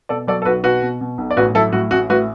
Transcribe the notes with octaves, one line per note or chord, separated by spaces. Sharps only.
B2 A4 D5
F#3 A4 D5
A4
B1 F#4 B4
B2 F#4 B4
B2
B2
B1
D5
A1 F#4 B4
F#3 E4 A4
A2 F#4
A1 F#4
A2 F#4 B4